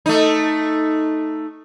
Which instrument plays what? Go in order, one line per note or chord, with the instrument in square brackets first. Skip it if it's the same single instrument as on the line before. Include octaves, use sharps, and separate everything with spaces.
[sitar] A3 D#4